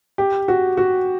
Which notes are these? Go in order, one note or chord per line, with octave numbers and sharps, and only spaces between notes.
G4
F#4
F#4